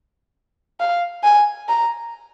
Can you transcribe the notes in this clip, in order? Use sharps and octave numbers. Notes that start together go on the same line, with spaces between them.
F5
G#5
A#5